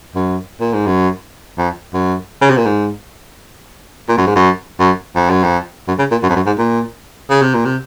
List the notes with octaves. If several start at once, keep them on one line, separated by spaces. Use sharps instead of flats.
F#2
A#2
G#2
F#2
F2
F#2
C#3
C3
A#2
G#2
A#2
F#2
G#2
F#2
F#2
F2
F#2
F2
F#2
C#3
A#2
F#2
F2
F#2
G#2
A#2
C#3
C3
A#2
C3